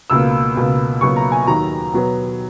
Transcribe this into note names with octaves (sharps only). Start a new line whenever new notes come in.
C#2 B2 A#3 E6
C#2 B2 A#3
C#2 B2 F#3 A#3 C#6
A#5
G#5
D#2 D#3 F#3 A#5
B2 F#3 B3